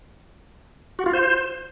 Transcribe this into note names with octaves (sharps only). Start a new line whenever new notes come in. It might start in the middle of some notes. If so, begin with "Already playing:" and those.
F#4
F4
C5